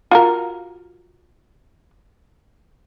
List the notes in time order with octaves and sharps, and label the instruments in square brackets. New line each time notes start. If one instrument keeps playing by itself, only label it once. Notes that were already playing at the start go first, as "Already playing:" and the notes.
[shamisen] F4 F#4 A#4